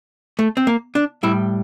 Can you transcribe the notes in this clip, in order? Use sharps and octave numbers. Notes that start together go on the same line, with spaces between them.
A3
C4
A#3
D4
A2 G3 E4